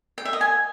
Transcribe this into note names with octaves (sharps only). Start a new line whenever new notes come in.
G5
E5
D#5
G#5